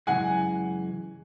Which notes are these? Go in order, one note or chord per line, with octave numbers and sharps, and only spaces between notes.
F#2 C#3 E3 G#3 F#5 G#5